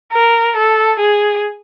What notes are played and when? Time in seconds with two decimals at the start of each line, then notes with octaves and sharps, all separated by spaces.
0.12 A#4
0.56 A4
1.00 G#4